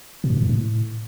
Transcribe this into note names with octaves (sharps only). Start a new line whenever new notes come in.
B2
G2
A#2
F#2
A2